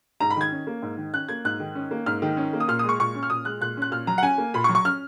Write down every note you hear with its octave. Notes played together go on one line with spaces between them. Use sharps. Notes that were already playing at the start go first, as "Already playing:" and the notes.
G#2 A#5
B5
D#3 G#6
C#4
A#3
G#2
D#3
C#4 F#6
A#3 G#6
G#2 F#6
D#3
C#4
A#3
G#2 F6
D#3
C#4
A#3
D#6
A#2 F6
D#6
G#3 C#6
A#2 C#6
C#4
F6
A#2 D#6
G#3 F#6
A#2 F#6
C#4 F#6
A#2 F6
F#3 A#5
F#5
C#4 G#5
A#3
A#2 B5
C#6
F#3
C#6
C#4 F6